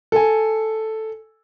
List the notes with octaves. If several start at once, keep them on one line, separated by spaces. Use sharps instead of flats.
A4 G#5